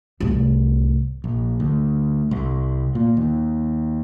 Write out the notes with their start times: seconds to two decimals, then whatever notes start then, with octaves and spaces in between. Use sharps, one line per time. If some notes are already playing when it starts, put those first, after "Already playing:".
0.20 C2 A2
1.24 A#1
1.60 D2
2.31 C2
2.95 A#2
3.17 D#2